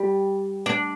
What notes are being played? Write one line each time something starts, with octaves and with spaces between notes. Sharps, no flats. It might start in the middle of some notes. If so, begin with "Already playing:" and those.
Already playing: G3
D4